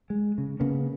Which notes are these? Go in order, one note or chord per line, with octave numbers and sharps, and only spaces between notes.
G#3
C#3
C#3 A#3 B3